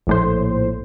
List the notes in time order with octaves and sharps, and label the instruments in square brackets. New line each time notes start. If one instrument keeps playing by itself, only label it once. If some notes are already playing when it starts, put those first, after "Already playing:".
[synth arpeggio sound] A#1 A2 C5